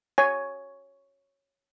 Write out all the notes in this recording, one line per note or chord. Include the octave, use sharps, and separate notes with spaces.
C#5 G#5